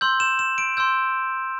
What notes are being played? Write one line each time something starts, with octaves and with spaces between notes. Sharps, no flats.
C6 E6 G6 F#7
E7
E7
D7
C6 E6 G6